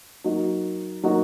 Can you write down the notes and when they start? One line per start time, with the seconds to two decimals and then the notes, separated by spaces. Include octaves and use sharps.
0.24 F#3 A#3 D#4 F#4
1.03 F#3 A#3 D#4 F#4